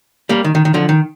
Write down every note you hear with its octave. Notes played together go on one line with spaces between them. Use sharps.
G3 A#3
D#3
D#3
D#3
D3 F3
D#3